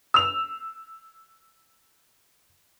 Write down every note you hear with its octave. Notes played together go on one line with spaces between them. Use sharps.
E6 F7